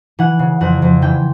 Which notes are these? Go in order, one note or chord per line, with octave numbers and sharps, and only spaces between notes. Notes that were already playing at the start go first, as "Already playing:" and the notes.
E3 F#5
C#3
F2 F#5
F2
E3 G5